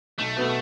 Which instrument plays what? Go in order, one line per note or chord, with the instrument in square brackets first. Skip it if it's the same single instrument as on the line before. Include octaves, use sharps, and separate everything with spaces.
[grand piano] B1 [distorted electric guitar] A3
[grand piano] B2 B3 A4